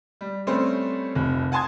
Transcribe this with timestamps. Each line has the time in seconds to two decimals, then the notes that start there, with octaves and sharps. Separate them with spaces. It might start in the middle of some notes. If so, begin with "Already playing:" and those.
0.21 G3
0.47 G3 A3 C4 C#4 B4 C5
1.15 F1 C2 B5
1.52 F#5 G#5 A5 C6 D#6 G#6